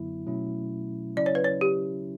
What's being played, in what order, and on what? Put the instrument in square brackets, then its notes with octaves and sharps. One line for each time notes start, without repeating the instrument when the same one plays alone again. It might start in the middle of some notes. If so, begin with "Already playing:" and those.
Already playing: [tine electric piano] F#2 D3 F#3 B3 E4
B2 F#3 A3 C#4 E4
[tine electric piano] C#3 F#3 C#4 E4 [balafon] D5
[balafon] C#5
B4
C#5
G4